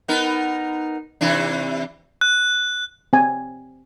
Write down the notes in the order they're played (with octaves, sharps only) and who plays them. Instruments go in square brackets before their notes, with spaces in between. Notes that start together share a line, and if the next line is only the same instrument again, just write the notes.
[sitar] B3 D#4 A#4
C3 E3 D4
[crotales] F#6
[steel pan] C4 G#5